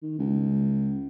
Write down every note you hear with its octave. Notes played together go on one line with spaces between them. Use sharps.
D#3
C#2